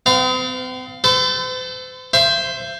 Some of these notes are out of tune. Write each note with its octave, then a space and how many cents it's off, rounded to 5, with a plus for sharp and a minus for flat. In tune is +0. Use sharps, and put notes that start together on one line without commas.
C4 -45 F5 +0
A4 +0 C5 -45
C5 +0 E5 +40